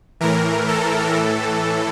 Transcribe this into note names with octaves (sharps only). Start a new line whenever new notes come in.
A2 E3 A#4
A4
A2 E3